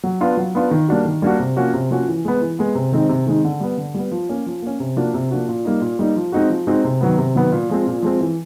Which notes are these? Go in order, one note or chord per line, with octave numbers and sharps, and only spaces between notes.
F#3
B3 D4 F4
F#3
B3 D4 F4
D#3
G3 A#3 D4 F#4
D#3
G3 A#3 D4 F#4
C3
F3 A#3 C#4 F#4
C3
F3 A#3 C#4 F#4
E3
G#3 B3
E3
G#3 B3
C3
D#3 G#3 C4 D#4
C3
D#3 G#3 C4 D#4
D3
G3 B3
D3
G3 B3
F3
A#3 C#4
F3
A#3 C#4
C3
F3 A#3 D4 F#4
C3
F3 A#3 D4 F#4
A#2
G3 A#3 D#4
A#2
G3 A#3 D#4
F3
G#3 C4 D#4 F#4
F3
G#3 C4 D#4 F#4
C3
D#3 F#3 B3
C3
D#3 F#3 B3
A#2
F3 G#3 C4
A#2
F3 G#3 C4
E3